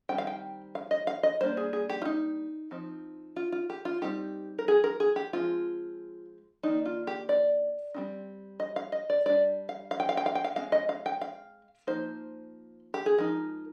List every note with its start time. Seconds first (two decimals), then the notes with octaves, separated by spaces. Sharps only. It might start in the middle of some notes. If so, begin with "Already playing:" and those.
0.09 D#3 G3 C4 G5
0.18 F5
0.27 G5
0.75 F5
0.91 D#5
1.07 F5
1.23 D#5
1.40 G3 A#3 D4 C5
1.57 G#4
1.73 G#4
1.90 G4
2.02 F4
2.05 D#4
2.71 F3 C4 D#4
3.36 F4
3.52 F4
3.70 G4
3.85 F4
4.02 G3 C4 D#4 G4
4.59 A#4
4.68 G#4
4.84 A#4
5.00 G#4
5.16 G4
5.33 F3 G#3 C4 F4
6.63 D#3 A#3 D4 D#4
6.86 F4
7.07 G4
7.29 D5
7.94 G3 C4 D#4
8.60 D#5
8.76 F5
8.92 D#5
9.10 D5
9.26 G3 D4 D5
9.69 F5
9.91 F5
10.00 G5
10.09 F5
10.17 G5
10.26 F5
10.35 G5
10.44 F5
10.56 G#3 C4 F5
10.72 D#5
10.89 F5
11.06 G5
11.21 F5
11.87 F3 A#3 D#4 C5
12.94 G4
13.06 G#4
13.18 F3 G#3 D#4 A#4